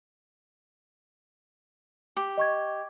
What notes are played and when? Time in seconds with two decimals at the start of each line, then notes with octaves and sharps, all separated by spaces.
2.17 G4
2.37 D#5 C#6 G#6